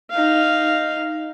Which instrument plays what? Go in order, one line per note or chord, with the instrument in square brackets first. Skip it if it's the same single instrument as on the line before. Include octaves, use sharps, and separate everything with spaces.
[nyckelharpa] D#4 F5